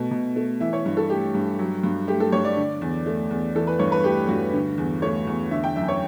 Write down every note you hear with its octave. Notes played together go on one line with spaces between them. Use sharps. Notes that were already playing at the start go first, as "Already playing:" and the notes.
Already playing: B2 A3
B2
A3
E3 E5
C#5
G2
A4
A3 G4
G2
F#3
G2
A3 G4
A4
G2 C#5
D5
D3
E2
A3
E2
E3 A4
B4
G2 C#5
B4
A3 G4
G2 F#4
D3
E2
A3 C#5
E2
D3 E5
G5
F#2 E5
C#5